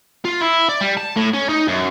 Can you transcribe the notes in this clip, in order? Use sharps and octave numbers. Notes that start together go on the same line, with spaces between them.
F4
E4
D5
G3
A5
A2
C#4
D#4
F#2